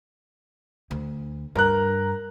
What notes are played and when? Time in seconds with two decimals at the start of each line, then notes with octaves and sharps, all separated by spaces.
0.91 D2
1.55 G2 A#4 A#5 F#6